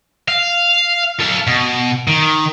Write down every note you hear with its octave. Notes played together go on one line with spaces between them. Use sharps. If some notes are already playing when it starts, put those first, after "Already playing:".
F5
A4 F5
B2
D#3